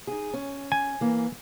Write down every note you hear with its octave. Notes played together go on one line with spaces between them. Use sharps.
D#4 G#4
C#4
G#5
E3 A#3